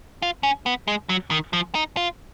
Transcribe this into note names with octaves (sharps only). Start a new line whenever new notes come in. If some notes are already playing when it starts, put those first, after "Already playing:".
F4
C#4
B3
G#3
F#3
D#3
F3
D#4
F4